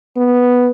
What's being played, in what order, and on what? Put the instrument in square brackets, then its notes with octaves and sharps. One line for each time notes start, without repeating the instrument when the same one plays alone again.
[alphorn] B3